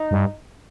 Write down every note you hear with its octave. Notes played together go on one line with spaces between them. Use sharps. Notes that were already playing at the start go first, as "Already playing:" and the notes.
Already playing: D#4
G2